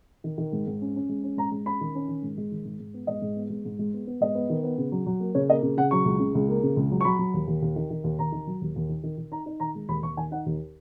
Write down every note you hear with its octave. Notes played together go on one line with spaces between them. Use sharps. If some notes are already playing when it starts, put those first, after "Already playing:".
D#3
D#3
G#2
G#2
C#4
C#4
G#3
C#4
G#2 A#5
G#3
C#4 B5
D#3
C#4
D#3
G#2
G#3
D#3
G#2
G#2
B3
G#2 D#5
G#2
B3
G#3
G#2
G#3
B3
B3
G#2 D#5
B3
D#3
B3
C#3
F#3
F#3
A#3
C#3 C#5
A#3 D#5
C#3
C#3 F#5
F#3 C#6
C#2
C#3
C#2
A#3
C#3
C#2
F#3
C#6
F#3 B5
F#3
D#2
D#2
D#2
D#3
D#3
D#2
D#2 A#5
D#3
F#3
D#2
D#2
D#3
D#3
D#3
D#4 A#5
D#4
D#3 A#5
G#3
D#2 B5
D#2 C#6
D#3 G#5
D#4 F#5
D#2